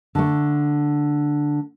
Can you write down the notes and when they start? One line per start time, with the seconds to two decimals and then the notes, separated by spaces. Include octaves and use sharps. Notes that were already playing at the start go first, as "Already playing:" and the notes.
0.15 D3 A3